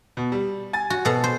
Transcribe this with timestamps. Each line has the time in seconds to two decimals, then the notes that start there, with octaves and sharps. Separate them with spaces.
0.17 B2
0.32 G3
0.73 G#5 A6
0.90 F#4
1.05 B2 A4
1.24 C5